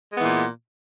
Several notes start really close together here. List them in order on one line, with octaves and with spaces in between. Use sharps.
G#3 B3 E3 A#2